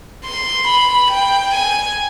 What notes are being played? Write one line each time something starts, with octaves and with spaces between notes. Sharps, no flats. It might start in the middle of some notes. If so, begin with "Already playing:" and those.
C6
B5
G5
G#5